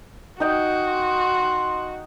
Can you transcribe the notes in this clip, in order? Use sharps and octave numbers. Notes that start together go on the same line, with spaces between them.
D#4 F#4 G5
C6